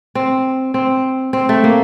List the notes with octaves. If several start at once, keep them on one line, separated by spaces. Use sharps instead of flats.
C4
C4
C4
A3
A#3